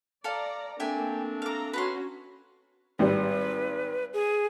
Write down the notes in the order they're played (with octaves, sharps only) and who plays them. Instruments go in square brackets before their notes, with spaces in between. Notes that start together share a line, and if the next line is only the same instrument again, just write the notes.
[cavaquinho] A4 F5 A5 [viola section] D5 A#5
[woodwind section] A3 C4 D4 [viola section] A#3 [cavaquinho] G4 E5 G#5
[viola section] A4 A#5 [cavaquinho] F5 D6
[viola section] C#4 F#4 [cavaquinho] B4 A#5 C6
[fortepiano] G#1 G3 [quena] B4
[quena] G#4